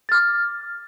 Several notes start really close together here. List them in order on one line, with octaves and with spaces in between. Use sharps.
A6 F6 D6